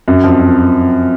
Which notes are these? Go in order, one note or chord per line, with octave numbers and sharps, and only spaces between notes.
F#2
F2
F2